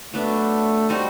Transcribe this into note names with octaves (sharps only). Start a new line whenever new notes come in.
F#3 A3 B3 D4
G3 C4 D#4 F#4